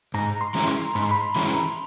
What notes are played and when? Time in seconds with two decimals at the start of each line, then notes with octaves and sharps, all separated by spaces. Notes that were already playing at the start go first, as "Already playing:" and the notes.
0.14 G#2 A#5
0.41 C6
0.55 E3 G#3 C#4 E4
0.68 C6
0.95 G#2 B5
1.03 C6
1.11 B5
1.36 E3 G#3 C#4 E4 B5